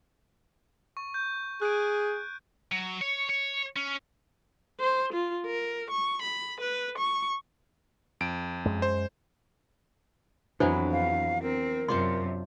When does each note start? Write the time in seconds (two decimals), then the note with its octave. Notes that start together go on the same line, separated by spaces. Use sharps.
0.97 C#6
1.14 G6
1.62 G#4 F#6 G#6 D7
2.72 F#3
3.01 C#5
3.30 C#5
3.76 C#4
4.80 C5
5.13 F4
5.46 A#4
5.91 C#6
6.22 B5
6.61 B4
6.98 C#6
8.21 F2 D7
8.65 F#2 G#3
8.82 C5
10.60 F2 E3 F#3 B3 D4 C5 G#5
10.92 F5
11.43 C4 A#4
11.88 F#2 C3 D4 F4 C5 C6